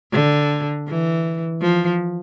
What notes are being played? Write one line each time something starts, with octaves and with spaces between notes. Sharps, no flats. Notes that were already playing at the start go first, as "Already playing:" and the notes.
D3
E3
F3